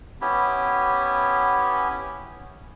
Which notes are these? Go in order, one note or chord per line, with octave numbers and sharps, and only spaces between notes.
B3 C#4 E4 G4